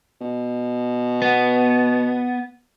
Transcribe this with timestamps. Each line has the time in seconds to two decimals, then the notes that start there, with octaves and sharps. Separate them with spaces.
0.21 B2
1.22 B3